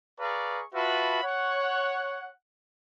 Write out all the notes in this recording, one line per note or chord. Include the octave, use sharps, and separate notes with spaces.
G#4 B4 D5 F5 A#5 C#6
F4 F#4 B4 E5 A5 B5
C#5 F#5